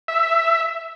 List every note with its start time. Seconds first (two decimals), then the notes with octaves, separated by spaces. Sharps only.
0.08 E5